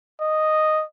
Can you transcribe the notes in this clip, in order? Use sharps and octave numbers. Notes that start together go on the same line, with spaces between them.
D#5